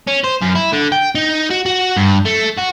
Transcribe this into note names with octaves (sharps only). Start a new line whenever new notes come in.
C#4
C5
F#2
E4
D3
G5
D#4
F#4
F#4
G2
A3
F#4